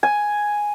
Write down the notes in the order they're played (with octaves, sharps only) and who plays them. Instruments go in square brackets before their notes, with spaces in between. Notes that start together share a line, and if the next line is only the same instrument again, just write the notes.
[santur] G#5